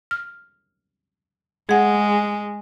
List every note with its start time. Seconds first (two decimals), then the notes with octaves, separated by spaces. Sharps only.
0.11 F6
1.69 G#3 G#4 F#5